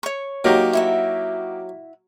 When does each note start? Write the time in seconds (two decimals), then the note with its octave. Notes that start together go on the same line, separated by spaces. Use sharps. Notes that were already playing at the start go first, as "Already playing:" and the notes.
0.03 C#5 C#6
0.44 F#3 A#3 D#4 G4
0.73 E4 F#4 E5